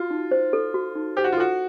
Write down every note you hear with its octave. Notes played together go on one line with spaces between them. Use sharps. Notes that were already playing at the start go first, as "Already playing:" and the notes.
Already playing: F4 F#4
D#4
C5
A4
F#4
D#4
G4 C5
F#4
F4
F#4 A4